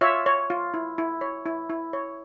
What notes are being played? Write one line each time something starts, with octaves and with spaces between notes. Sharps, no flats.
F4 C#5 E5
C#5
F4
E4
E4
C#5
E4
E4
C#5